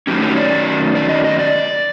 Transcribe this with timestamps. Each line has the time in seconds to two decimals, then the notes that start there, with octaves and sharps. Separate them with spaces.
0.07 F#2 D#3 F#3 A3 C#4 G4
0.22 C#5
0.37 D5
0.95 D5
1.09 D#5
1.25 D#5
1.39 D5